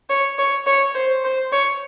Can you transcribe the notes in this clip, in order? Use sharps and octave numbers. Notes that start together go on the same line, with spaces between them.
C#5
C#5
C#5
C5
C5
C#5